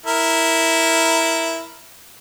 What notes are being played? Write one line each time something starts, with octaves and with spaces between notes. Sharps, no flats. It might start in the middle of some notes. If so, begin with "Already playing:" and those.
E4 A#4